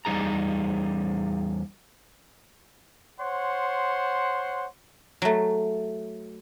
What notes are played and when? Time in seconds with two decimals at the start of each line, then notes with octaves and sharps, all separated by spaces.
0.05 E2 G3 D#4 G#4 A#5
3.19 C5 C#5 F#5 C6
5.22 F#3 A3